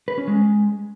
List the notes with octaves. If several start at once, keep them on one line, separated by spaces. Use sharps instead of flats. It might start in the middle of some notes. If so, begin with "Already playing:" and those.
B4
C#4
G#3